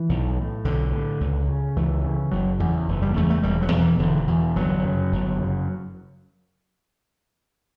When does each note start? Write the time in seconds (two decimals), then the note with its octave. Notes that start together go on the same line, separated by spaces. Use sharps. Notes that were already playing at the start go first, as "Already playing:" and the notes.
Already playing: E3
0.09 B1
0.37 A2
0.64 B1 D3
0.92 A2
1.20 C#2
1.48 C#3
1.76 C#2 E3
2.04 C#3
2.32 F#1 F#3
2.59 E2 D3
2.63 C#3
2.88 F#1 E3
3.02 G3
3.15 E2 C#3 A3
3.30 A3
3.43 E1 G3
3.62 F#3
3.71 E2 B2
3.81 E3
3.99 E1 D3
4.27 E2 B2
4.56 G1 F#3
4.84 F#2 C#3
5.12 G1
5.39 F#2 C#3